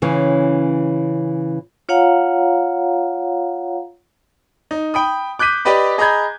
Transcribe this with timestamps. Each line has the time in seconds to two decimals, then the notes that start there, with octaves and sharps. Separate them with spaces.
0.02 C#3 E3 C#4
1.89 F4 C#5 F5 F#5 A#5
4.71 D#4
4.94 G5 B5 D#6
5.39 D6 F#6 G6 B6 D#7
5.65 G4 B4 D5 D#5 B5
5.98 G#4 D#5 A#5 B5 G6 G#6